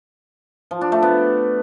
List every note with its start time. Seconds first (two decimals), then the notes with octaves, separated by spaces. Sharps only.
0.71 F3
0.81 D4
0.92 A3
1.02 B3